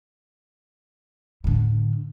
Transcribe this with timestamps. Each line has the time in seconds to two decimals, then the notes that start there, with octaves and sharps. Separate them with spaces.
1.44 A2 D3